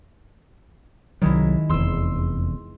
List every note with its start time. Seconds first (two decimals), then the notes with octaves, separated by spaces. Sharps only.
1.22 C2 D#3 F#3 G#3 E4
1.69 F1 E2 C6 E6